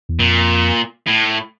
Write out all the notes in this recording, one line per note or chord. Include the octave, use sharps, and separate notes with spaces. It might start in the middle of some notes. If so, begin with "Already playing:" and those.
E2
F2 A#2
A2